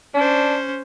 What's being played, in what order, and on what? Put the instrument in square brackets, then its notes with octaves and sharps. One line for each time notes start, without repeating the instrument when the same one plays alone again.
[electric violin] C#4 C5 [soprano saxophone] D4